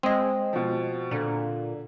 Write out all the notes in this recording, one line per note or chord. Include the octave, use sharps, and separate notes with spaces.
G#3 C4 D#5
B2 F3
A#2 D3